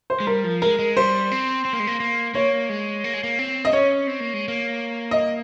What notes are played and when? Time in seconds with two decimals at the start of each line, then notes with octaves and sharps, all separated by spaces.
0.10 C5
0.20 G#3
0.27 G3 A#4
0.44 F3
0.62 G#3 A#4
0.79 G#3
0.97 G3 C5
1.31 C4
1.65 C4
1.73 A#3
1.80 G#3
1.87 A#3
2.00 A#3
2.34 A#3 C#5
2.69 G#3
3.04 A#3
3.14 G#3
3.23 A#3
3.39 C4
3.65 D#5
3.73 C#4 C#5
4.07 C4
4.20 A#3
4.34 G#3
4.48 A#3
5.11 D#5